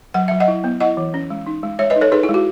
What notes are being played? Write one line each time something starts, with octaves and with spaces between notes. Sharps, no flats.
F#3 F#5
F#3 E5
D#5 F#5
E4
B3
E4 D#5 F#5
E3
C#4
G#3
D#4
G#3
G#3 C#5 E5
B4 D#5
D#4
A4 C#5
D#4 G#4 B4
E4
G#3
F#4